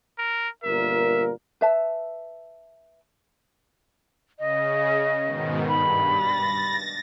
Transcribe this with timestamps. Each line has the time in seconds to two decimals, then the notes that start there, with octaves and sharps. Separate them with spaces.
0.18 A#4
0.64 G1 A#2 A#4 E5
1.61 B4 E5 A5
4.39 C#3 D#5
5.23 G#2 B2 D#3
5.68 G2 B5
6.11 A6 A#6